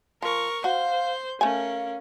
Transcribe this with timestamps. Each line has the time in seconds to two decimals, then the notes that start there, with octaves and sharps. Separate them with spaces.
0.22 F3 A#4 C#6
0.64 F#4 C5 F5 G6
1.41 A3 C#4 A#4 F5 G#5